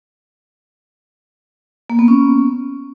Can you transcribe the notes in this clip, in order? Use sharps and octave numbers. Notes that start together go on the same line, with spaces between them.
A#3
B3
C#4